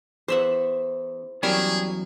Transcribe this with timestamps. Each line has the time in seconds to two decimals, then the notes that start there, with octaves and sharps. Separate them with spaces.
0.28 E2 C5 E5 F#5
1.43 E2 F#3 G3 C#4 E4 G#4 A#4